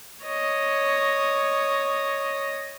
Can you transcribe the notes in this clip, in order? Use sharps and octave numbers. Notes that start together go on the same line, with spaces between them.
C#5 D#5